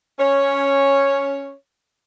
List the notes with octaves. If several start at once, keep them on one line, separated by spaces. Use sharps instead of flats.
C#4 C#5